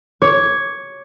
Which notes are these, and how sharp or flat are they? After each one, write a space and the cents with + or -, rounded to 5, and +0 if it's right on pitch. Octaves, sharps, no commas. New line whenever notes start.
C#5 +0 D6 -15